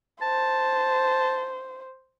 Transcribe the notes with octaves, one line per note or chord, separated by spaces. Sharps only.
C5 A5